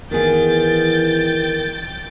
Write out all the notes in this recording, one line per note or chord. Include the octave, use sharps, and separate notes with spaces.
D#3 E3 B3 G#4 G5 A6